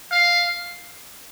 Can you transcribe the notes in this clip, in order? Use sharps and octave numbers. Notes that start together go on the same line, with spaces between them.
F5